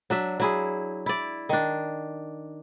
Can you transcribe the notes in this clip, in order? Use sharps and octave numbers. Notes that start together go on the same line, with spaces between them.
F#3 D4 E5
F#3 E4 G#4
E4 D5
D#3 D4